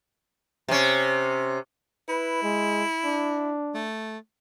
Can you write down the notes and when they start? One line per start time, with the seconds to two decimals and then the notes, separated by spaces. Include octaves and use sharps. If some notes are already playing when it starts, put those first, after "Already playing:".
0.68 C3 C#4
2.09 E4 B4
2.43 G#3
3.05 D4
3.75 A3